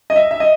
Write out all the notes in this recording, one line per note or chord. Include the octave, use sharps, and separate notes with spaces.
D#5
E5
E5
D#5